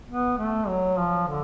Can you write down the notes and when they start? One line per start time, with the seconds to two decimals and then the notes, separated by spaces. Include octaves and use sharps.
0.08 B3
0.37 A3
0.68 F#3
0.97 F3
1.27 D3